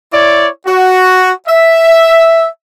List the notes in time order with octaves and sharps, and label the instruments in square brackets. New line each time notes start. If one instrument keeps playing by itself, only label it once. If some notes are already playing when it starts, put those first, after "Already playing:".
[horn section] E4 C#5 D5
F#4
E5